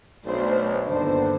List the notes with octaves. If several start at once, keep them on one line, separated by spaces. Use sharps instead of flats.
B1 A3 D4 C5
G1 D#2 D3 B3 D4 C5